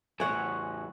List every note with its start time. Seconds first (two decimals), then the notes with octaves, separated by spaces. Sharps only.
0.20 E2 A2 C#5 F#5 G#5 C#6 F#6